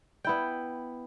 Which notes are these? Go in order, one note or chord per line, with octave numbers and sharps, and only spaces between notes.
B3 E4 G5